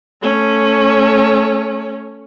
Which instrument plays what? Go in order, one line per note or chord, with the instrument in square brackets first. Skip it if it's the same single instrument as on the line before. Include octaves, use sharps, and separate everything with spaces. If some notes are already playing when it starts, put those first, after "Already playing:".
[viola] A3 C#4